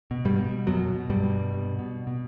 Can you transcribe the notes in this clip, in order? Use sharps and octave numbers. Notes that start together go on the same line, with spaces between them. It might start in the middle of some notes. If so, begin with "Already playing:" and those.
B2
G2 G3
B2
F#2 B2 F#3
B2
G2 G3
B2
B2
B2
B2